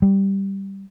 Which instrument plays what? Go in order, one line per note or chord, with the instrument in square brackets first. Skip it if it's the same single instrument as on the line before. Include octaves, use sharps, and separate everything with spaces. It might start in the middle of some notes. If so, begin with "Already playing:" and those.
[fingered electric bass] G3